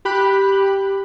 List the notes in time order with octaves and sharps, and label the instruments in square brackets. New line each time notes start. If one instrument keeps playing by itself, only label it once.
[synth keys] G4 B5 F#6